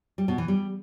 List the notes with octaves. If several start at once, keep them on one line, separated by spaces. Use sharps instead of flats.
G3
B2
E3
G3